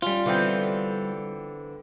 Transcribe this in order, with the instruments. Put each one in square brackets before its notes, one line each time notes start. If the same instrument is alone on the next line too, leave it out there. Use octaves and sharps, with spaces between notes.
[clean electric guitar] G3 F4 [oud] C#4
[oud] D3 [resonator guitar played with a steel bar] E3 B3 C4